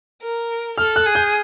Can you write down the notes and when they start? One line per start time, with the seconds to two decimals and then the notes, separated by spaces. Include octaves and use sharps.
0.22 A#4
0.77 A4 F6
0.96 F#6
1.05 G#4
1.15 G6